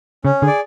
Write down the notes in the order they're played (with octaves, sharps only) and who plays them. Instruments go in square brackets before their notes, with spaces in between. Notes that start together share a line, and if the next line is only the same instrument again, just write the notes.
[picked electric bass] C#3 [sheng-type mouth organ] C#4
[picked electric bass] D3 [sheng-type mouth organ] G#4
[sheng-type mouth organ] D5